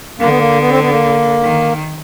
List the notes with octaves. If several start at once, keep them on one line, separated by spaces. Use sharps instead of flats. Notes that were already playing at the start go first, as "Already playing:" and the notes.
D3 A#3
B3
A#3
B3
C4
B3
A#3
D#3